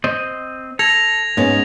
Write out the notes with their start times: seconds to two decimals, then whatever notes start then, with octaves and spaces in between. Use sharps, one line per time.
0.04 C4 C5 D#5
0.79 A4 G#6 A#6 F7
1.37 G#2 G#3 B3 C#4